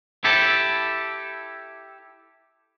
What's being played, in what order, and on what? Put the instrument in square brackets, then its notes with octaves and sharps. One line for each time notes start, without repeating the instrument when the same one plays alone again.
[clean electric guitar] E4 G4 A4